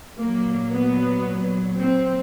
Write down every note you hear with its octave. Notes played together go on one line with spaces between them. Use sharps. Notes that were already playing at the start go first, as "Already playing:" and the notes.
A#2 F#3 A#3
B3
C4